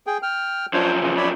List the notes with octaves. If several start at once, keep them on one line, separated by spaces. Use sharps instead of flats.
G#4 G5
G5 F6
F#2 F3 D4 C5 C#5
C#3 E3
C#5 D5 B5